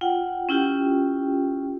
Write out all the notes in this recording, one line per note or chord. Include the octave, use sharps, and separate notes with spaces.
F4 F#5 G5
C#4 E4 F4 G4 G5